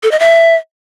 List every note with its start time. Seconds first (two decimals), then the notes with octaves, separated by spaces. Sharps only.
0.03 A4
0.11 D#5
0.20 E5